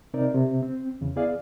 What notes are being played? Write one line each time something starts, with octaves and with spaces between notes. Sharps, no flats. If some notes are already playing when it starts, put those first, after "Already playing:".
C3 C4 D#4 A#4 D5
C3
C4
E2 C#3
B3 E4 G#4 D5 F5